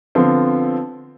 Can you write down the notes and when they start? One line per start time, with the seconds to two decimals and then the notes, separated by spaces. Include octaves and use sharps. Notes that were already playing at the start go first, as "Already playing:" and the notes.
0.15 D3 F3 B3 C4